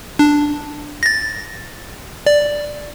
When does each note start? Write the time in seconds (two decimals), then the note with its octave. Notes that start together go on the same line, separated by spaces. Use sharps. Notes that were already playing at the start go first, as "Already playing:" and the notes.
0.19 D4
1.03 A6 A#6
2.26 D5